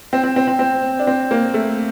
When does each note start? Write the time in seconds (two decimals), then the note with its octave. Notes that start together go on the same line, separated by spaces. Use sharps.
0.13 C4
0.23 C4
0.36 C4
0.47 C4
0.59 C4
0.99 D4
1.07 C4
1.31 A#3
1.54 A3